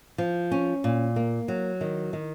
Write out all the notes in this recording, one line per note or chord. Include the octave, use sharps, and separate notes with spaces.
F3
C#4
A#2
A#3
F#3
D#3
D#3